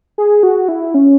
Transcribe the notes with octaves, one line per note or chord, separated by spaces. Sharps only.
G#4
F#4
E4
C#4